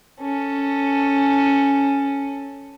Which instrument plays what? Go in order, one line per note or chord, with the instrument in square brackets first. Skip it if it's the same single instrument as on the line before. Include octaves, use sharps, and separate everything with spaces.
[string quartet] C#4 A4